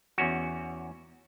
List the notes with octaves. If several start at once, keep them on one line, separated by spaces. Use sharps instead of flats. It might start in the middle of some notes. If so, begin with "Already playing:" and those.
E2 C#4 F#4